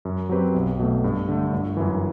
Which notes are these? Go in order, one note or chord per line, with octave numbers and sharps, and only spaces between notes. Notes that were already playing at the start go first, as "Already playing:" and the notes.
F#2
F#3 C4 G4 B4
B1
B2 A3
G2
D3 A3
G1
F#2 E3